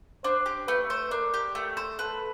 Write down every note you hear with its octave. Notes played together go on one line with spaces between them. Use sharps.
D4 C5
G4
A3 B4
C5
D4 A#4
G4
A3
C5
A4 B4